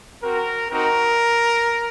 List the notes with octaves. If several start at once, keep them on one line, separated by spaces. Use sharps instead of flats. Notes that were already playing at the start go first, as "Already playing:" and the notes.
C4 F#4 A#4
C4 D#4 F#4 A#4